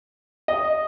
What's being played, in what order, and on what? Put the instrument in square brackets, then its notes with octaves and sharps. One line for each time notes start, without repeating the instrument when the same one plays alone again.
[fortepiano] D#5